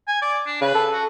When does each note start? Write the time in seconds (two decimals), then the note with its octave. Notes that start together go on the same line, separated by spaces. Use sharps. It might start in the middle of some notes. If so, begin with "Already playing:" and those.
0.08 G#5
0.22 D5
0.46 D4
0.61 C#3 B4
0.75 A4
0.93 F#4